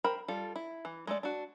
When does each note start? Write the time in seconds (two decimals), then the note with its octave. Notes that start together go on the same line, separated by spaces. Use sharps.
0.04 A#4 C5 G5 B5
0.28 G3 F4 A4
0.56 E4
0.85 E3
1.07 G#3 A3 D5
1.23 D4 F#4